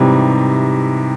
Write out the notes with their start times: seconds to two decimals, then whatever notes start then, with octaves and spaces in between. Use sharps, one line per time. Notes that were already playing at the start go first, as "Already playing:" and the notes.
Already playing: G#2 C3 E3 G3